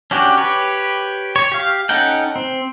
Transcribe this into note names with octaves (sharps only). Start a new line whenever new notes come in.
C#4 D4 F#4 G4
G4 B4 C#5
C#5
G4 F5
C#4 D#4 A4 F#5 G5
C4